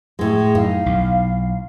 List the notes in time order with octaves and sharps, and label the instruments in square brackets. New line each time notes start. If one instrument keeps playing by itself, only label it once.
[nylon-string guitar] A2 G#3
[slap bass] F#2 [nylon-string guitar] D#4 [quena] F5
[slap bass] B1